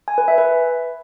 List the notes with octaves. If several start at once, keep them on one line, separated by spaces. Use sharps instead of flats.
G#5
B4
E5
B4